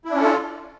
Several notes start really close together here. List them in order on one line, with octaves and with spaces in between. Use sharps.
E4 D4 C#4 A4 F4